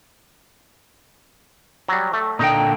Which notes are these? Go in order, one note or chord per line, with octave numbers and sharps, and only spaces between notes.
F#3 G3
A3
A#2 D3 D#4 G5